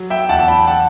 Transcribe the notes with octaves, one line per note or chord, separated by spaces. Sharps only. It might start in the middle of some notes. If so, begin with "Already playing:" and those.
Already playing: F#3
E5 G5
E2 F#5 A5
A5
G5 B5
F#5 A5